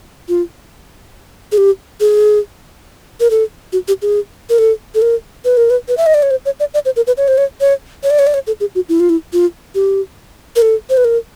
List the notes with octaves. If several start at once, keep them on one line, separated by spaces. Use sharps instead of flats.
F4
G#4
G4
G#4
A#4
A4
F#4
G4
G#4
A#4
A4
A4
A#4
B4
A#4
B4
B4
E5
D#5
D5
C#5
C5
C#5
D5
D5
C5
A#4
B4
C#5
C5
C#5
C#5
C#5
D5
C#5
D5
C#5
A4
G#4
F#4
E4
F4
E4
F4
G4
A#4
A4
C5
B4
A#4